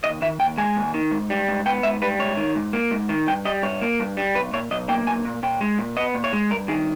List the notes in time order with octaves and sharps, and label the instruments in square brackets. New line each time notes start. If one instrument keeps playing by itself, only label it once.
[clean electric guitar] D#2 D#5
D#3 E5
D#2 G5
G#3 G#5
D#2
D#3
G#2
G3
G#2
B3 G5
G#2 E5
G3 B4
G#2 C#5
D#3
G#2
A#3
G#2
D#3
G2 G5
G3 D#5
G2 C#5
A#3
G2
G3
B1 B4
A#2 C#5
B1 D#5
A#3 G5
B1 G#5
A#2
A#2 G5
G#3
A#2
B3 D#5
A#2
C#5
G#3
G2 A#4
D#3 G#4